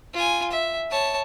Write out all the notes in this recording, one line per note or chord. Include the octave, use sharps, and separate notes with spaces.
F4 G#5
E5
C#5 A5